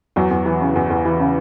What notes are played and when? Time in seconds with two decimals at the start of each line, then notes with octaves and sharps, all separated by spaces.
0.16 E2 F#3
0.31 E2
0.46 E3
0.61 C#3
0.76 E2
0.90 E2
1.05 E3
1.20 C#3